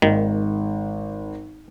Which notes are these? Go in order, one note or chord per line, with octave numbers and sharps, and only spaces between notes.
G#1 D#3